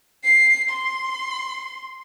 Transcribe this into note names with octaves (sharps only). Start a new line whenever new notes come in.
C7
C6